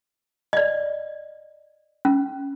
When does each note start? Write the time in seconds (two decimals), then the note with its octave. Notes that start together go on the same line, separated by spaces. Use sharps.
0.53 D5 D#5
2.05 C#4